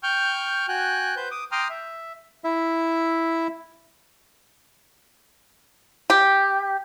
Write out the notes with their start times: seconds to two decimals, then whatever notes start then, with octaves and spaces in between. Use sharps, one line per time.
0.03 G5 C#6 F6 G6
0.68 F#4 G5 G#5 F#6
1.16 B4 C5 G6
1.31 D6 D#6
1.52 G5 A#5 C6 D6 D#6 F6
1.69 E5
2.44 E4 E5
6.10 G4